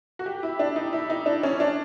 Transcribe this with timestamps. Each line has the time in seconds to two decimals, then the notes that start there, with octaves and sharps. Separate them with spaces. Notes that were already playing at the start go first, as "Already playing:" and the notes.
0.19 F#4
0.26 G4
0.43 E4
0.59 D4
0.76 D#4
0.93 E4
1.10 D#4
1.26 D4
1.43 C#4
1.60 D4